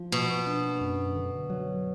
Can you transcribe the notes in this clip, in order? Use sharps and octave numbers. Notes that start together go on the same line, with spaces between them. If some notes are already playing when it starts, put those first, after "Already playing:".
Already playing: F3
B2 A#3
D4
F#2
D3
F#3